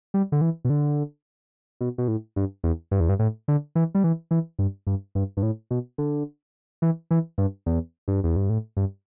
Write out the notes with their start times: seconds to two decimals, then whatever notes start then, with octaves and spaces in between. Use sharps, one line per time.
0.14 G3
0.32 D3
0.41 E3
0.65 B2
0.70 D3
1.81 B2
1.98 B2
2.08 A2
2.36 G2
2.64 E2
2.91 G2
3.00 E2
3.09 G2
3.19 A2
3.48 D3
3.75 E3
3.95 G3
4.04 E3
4.31 E3
4.59 G2
4.87 G2
5.15 G2
5.37 G2
5.43 A2
5.71 B2
5.98 D3
6.82 E3
7.11 E3
7.38 G2
7.66 E2
8.08 G2
8.24 E2
8.36 G2
8.50 A2
8.77 G2